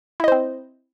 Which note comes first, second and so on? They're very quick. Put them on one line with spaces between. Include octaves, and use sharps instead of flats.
E4 D#5 C5 C4